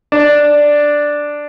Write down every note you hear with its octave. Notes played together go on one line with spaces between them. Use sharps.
D4